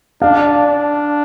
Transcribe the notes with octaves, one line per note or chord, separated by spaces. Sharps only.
D4 F5
D4